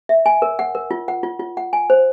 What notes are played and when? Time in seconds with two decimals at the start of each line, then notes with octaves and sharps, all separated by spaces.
0.09 E5
0.26 G#5
0.42 A#4
0.59 F#5
0.75 A#4
0.91 F4
1.08 F#5
1.23 F4
1.40 F4
1.57 F#5
1.73 G#5
1.90 C5